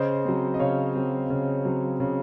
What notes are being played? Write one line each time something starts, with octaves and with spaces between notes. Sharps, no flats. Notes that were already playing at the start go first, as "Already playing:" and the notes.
Already playing: C#3 C5 D#5
F#3 C4
D#5
C#3 C#5 F5
F#3 C4
C#3
F#3 C4
C#3